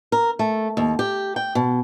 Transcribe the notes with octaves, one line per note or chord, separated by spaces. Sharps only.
A#4
A3
D#2
G4
G5
B2